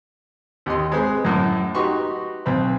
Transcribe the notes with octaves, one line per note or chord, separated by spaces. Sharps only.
D#2 G4 D#5 C6
G#3 C4 B4 C5
F#2 A2
D#4 F#4 G4 B4 C6 C#6
B1 C4 B4